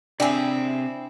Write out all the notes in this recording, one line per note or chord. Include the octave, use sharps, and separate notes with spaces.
C3 C4 D4 E4 G4 G#4 D5 G#5